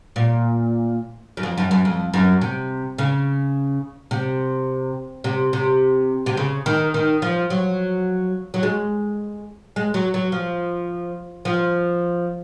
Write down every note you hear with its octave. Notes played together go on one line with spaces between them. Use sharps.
A#2
F#2
F2
F#2
F#2
F2
F#2
C3
C#3
C3
C3
C3
C3
C#3
D#3
D#3
F3
F#3
F#3
G#3
G#3
F#3
F#3
F3
F3